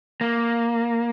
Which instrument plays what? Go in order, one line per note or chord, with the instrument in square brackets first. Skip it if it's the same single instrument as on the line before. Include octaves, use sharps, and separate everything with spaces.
[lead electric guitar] A#3